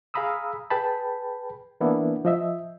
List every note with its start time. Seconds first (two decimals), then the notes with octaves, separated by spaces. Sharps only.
0.14 G#4 F5 A#5 B5 D#6 E6
0.70 G#4 B4 G5 A5 B5
1.80 E3 A#3 B3 D4 E4
2.25 F3 D#5 E5